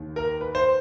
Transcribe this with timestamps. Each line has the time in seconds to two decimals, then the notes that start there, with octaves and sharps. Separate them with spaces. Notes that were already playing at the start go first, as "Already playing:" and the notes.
Already playing: D#2 D#3
0.16 A#4
0.41 B4
0.55 C5